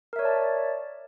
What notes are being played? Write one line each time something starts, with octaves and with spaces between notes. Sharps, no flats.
A#4 C#5 D5 E5 A5